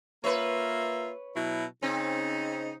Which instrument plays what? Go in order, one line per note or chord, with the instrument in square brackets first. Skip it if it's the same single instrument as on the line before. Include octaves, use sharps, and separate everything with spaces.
[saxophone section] A#3 F4 E5 [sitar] B4 C#5
[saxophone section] B2 F#3 E4
[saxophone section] C#3 D#4 [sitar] C4